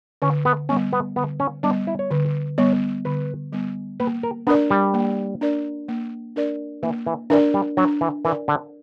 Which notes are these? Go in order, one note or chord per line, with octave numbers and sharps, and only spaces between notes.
D3 C#4
B3
G3 B3 C#4
B3
D3 B3
C#4
G3 B3 D4
E4
C#5
D3 B4
G3 B3 C#5
D3 B4
G3 B3
A#3 B4
A#4
B3 D4 A#4 D5
G3
A#3
D4 A#4 D5
A#3
D4 A#4 D5
E3 A#3
E3
E3 D4 A#4 D5
G3
F#3 D4
E3
E3 A#4 D5
D3